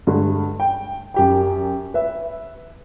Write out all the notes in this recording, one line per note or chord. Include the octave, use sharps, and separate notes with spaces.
G2 D3 G#3 A3
G5
F#2 G4 G5
B4 E5